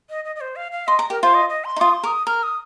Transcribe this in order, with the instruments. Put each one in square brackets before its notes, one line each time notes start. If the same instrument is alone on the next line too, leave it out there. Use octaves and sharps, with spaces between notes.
[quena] D#5
D#5
D#5
C5
F5
F5
[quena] D#5 [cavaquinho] C6
[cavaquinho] A#5
[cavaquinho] G4 [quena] A#4
[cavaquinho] F4 [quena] C5
[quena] D#5
D#5
C6
[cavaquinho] D#4
[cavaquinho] F4 [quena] D#6
[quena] C6
[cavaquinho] A#4 [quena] D#6
[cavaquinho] A#4 [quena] F6
[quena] D#6